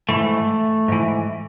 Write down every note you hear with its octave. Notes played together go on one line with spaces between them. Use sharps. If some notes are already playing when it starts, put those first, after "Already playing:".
G#2 E3 A3
G#2 E3